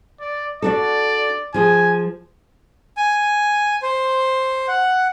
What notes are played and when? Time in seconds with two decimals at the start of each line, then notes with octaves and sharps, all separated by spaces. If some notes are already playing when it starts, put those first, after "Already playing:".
0.21 D5
0.62 D4 F#4 A4 D5
1.54 F3 G#4 G#5
2.97 G#5
3.82 C5
4.68 F#5